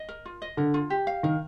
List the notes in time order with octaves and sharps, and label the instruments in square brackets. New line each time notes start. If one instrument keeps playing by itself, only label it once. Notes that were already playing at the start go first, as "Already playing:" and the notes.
Already playing: [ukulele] D#5
A#4
F4
D#5
[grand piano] D3 [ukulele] A#4
[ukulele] F4
G4
F5
[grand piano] D#3 [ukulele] A#4